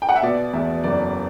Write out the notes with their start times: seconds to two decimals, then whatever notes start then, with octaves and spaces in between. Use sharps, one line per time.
0.02 G5
0.09 F#5
0.16 E5
0.22 B2 D5
0.53 E2 E5
0.84 F#1 D5